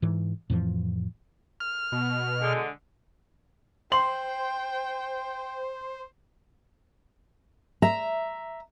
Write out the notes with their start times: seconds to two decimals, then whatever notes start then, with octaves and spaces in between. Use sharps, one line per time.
0.02 G#2 E3
0.50 F2 A2 E3 F3
1.60 F6
1.92 B2
2.40 D3 G#3
3.92 C5 G5 C6 F#7
7.82 E5 A#5